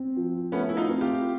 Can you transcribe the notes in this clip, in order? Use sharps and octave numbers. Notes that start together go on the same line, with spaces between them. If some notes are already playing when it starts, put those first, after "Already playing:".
Already playing: C4
F3
A3 B3 C#4
E4
D#4 F4
C4
F4 G4